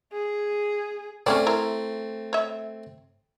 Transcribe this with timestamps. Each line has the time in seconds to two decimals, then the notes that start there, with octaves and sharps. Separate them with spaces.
0.13 G#4
1.26 A3 C4 C#4 G#4 D5
1.46 E4 A#4 C5
2.33 C#5 E5